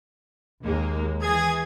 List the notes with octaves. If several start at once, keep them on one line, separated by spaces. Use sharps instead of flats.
D#2 G#3 A#3
E3 G#4 G#6